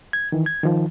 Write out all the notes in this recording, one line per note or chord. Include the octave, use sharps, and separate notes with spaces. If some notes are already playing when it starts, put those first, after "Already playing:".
G#6
D#3 E3
G#6
D#3 F3